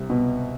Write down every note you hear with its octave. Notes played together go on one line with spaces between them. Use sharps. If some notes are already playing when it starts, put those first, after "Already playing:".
Already playing: C2
B2